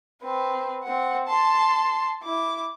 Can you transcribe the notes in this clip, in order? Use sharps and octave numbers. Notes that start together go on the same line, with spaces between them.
C4 B4
C4 F#5
A5 C6
E4 D6